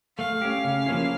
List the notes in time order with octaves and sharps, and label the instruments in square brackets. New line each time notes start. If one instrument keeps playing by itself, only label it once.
[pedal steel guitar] A3 [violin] F5
[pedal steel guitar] C#4 G4
C#3
F3 A#3 C#4 E4